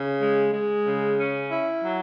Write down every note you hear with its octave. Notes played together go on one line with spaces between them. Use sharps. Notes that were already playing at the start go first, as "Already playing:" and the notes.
Already playing: C#3
G#3
G#3
C#3
C#4
E4
F#3